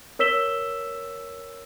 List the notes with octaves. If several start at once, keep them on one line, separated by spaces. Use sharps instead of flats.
A#4 C#5 E6 B6 E7 G7